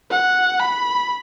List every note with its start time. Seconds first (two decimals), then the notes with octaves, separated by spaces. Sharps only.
0.11 F#5
0.60 B5